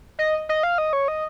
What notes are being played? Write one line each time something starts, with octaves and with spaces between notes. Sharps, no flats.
D#5
D#5
F5
D#5
C#5
D#5